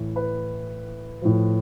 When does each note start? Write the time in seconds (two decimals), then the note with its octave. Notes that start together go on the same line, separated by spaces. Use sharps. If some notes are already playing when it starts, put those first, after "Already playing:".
Already playing: A2 E3
0.16 B4
1.22 A2 F3